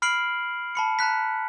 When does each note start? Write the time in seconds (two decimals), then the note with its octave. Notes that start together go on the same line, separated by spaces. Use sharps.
0.02 B5 F6 C7 D7 F#7
0.75 A5 B5 C#7
0.99 A5 A#5 F#6 B6